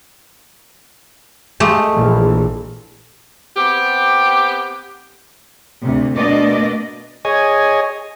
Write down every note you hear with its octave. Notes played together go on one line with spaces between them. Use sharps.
G#3 A3 G4
A#1 A#2 E3
B3 C4 G4
D2 C3
B2 A3 A#3 D4 D5 D#5
G#4 C#5 D#5 G#5